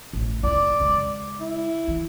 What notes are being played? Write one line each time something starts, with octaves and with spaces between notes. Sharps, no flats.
A1 A2
F1 E4 D5
C#3 G#3
E4
E3